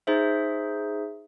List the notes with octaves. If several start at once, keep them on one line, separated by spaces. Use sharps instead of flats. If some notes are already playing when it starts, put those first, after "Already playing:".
D#4 G#4 C5 E5